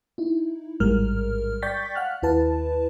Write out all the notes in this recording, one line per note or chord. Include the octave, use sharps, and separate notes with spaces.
D#4 E4
A1 G#2 G3 G#3 A#4 F6
D5 G5 C#6 G6 A6 B6
F5 F#5 F6 F#6
D#2 E4 B4 A5